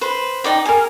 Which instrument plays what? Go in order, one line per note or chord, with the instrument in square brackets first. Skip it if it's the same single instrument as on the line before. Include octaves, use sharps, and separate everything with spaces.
[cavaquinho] B4 C5
D#4 D5 G5
G#4 A#4